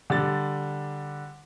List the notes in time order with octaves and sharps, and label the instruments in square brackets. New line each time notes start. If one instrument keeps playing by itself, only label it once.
[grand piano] D3 G3 A6